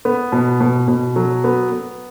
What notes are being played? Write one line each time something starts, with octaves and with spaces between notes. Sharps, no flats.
B3
B2
B2
B2
F#3
B3
B3